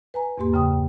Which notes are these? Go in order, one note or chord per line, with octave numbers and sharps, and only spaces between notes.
B4 G#5 A#5
E2 G#2 A#3 G4 C6
F#2 C#3 G5 D#6